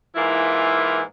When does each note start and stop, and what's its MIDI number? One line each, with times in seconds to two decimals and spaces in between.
0.15 1.02 44
0.15 1.02 52
0.15 1.02 58
0.15 1.02 64
0.15 1.02 65